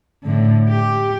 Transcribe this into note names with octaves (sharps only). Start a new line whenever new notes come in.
A2 D3
G4